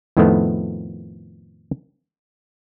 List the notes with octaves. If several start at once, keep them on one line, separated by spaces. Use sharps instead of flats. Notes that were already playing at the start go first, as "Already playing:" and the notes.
F2 A2 D#3 F3 A3 B3